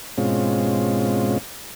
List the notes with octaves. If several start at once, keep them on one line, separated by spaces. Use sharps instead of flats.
G#2 B2 G#3 C4 C#4 F4